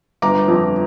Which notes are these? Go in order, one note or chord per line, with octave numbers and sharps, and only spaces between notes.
G1 A#5 D6
F2